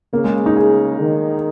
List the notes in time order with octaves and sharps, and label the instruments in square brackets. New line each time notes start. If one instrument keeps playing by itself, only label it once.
[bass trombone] C#3 [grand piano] A#3
[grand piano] G#3
D#4
G#4
[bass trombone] D#3